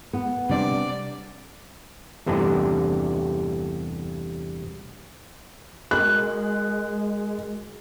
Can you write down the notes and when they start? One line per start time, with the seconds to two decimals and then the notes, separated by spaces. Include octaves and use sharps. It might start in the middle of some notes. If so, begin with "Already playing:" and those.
0.13 B3
0.49 C3 G3 D4 D5
2.26 E2 G2 C3 G3 A3 D4
5.91 G#3 F#4 A#4 F#6